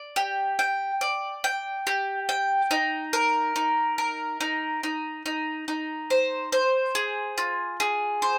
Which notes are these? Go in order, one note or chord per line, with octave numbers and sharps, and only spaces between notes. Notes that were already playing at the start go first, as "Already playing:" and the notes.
Already playing: D5
G4
G5
D5
G5
G4
G5
D#4
A#4
D#4
A#4
D#4
D#4
D#4
D#4
C5
C5
G#4
F4
G#4
C5